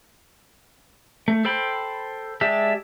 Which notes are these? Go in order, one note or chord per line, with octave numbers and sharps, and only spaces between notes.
A3
A4 C5 G5 B5
G#3 G4 D5 E5 A5